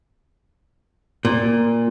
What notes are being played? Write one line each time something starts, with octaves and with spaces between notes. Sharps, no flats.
A#2